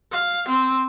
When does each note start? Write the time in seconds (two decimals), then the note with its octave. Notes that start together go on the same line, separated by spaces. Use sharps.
0.12 F5
0.48 C4